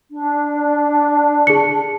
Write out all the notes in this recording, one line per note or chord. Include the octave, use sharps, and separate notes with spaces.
D4
G#4 C#7